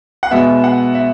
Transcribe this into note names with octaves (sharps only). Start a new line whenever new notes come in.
F#5
B2 G#3 B3 E5
F#5
E5